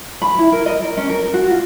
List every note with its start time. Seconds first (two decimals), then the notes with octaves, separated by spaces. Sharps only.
0.22 B5
0.39 E4
0.52 A#4
0.66 D#5
0.82 A#4
0.97 C#4
1.09 A#4
1.34 F#4
1.51 F4